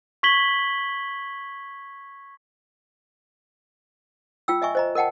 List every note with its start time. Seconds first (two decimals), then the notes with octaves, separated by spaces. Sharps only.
0.23 C#6 G#6 B6 F#7 G7
4.48 F4 G5 E6
4.62 D#5 E5 G#5 C#6
4.75 C5 D#5 A#5
4.95 A#4 D#5 F#5 G5 A5